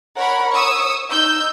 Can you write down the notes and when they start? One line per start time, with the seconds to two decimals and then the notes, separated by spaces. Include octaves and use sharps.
0.16 A#4 C#5 F#5 B5
0.52 C#5 C#6 D#6 E6
1.10 D#4 E6 G6